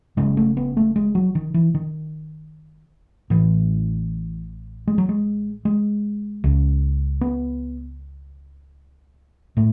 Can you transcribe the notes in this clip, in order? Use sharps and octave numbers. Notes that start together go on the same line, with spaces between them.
F#1 F#2 C#3 G#3
A3
B3
A3
G#3
F#3
D#3
E3
D#3
A1 A2 E3
G#3
F#3
G#3
G#3
C#2 C#3
B3
A2 A3